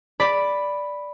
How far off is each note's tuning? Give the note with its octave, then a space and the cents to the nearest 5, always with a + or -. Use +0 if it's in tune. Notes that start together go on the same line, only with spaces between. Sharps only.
D5 +0 B5 +0